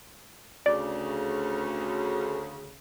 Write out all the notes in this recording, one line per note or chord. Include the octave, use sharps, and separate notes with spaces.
D2 C#3 D5